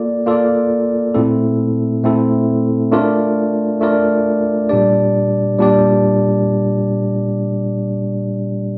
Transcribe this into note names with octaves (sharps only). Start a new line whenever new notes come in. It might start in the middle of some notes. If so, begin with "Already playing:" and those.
Already playing: A#3 F4 A4 D5
A#3 F4 A4 D5
A#2 A3 C4 E4 A4
A#2 A3 C4 E4 A4
A3 D4 F4 A#4 D5
A3 D4 F4 A#4 D5
A#2 G3 D4 G4 D5
A#2 G3 D4 G4 D5